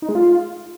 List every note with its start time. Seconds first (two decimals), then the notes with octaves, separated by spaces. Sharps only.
0.02 D#4
0.09 G#3
0.15 F4